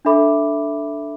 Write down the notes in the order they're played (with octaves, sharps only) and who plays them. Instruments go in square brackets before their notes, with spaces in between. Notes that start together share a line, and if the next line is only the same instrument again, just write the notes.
[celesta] D4 A4 E5 B5 D6